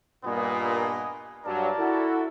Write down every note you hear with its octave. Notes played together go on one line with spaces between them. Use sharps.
G2 A#2 B3 D#5 G#5
G2 F#3 A#4 D5 A5
E4 F#4 A4